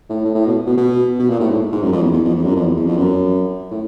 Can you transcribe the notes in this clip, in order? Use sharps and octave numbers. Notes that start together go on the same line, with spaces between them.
A2
A2
A2
B2
B2
B2
B2
A#2
A2
G#2
G#2
F#2
F2
E2
E2
F2
E2
F#2
F2
E2
E2
F2
F#2
A2